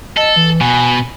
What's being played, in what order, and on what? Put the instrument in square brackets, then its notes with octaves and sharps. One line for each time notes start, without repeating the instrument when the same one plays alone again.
[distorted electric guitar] A4 [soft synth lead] D#5
[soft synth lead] E3
[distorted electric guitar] B2 [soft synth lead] G#5